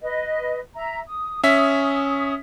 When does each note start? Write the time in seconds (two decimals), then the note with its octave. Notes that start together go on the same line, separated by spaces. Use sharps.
0.01 B4 D#5
0.75 E5 A#5
1.05 D#6
1.43 C#4 E5 D#6 B6